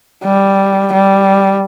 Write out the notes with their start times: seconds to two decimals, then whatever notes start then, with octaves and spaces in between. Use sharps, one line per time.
0.24 G3
0.93 G3